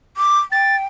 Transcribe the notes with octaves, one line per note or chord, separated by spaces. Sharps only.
D6
G5 A6